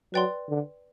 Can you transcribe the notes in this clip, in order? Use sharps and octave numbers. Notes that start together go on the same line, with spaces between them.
F#3 B4 D5 G5 C6
D3